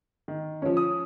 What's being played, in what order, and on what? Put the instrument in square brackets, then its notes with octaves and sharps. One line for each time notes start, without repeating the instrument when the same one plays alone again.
[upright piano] D#3
[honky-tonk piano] F3 C#4
[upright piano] D#6